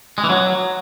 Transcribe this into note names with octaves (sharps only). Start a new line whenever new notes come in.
G#3
E3
F#3